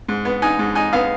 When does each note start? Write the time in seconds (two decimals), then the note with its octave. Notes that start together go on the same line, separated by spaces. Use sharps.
0.09 G#2
0.25 B3
0.42 D#4 G#5
0.59 G#2
0.75 D#4 G#5
0.93 B3 F5